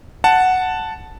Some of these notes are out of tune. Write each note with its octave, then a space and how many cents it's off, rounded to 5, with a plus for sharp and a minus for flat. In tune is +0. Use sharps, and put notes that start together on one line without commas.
F#5 +0 A5 +0